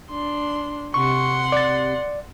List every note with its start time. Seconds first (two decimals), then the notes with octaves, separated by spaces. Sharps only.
0.11 D4 C6
0.94 C3 F#5 C6 C#6
1.52 D5 A6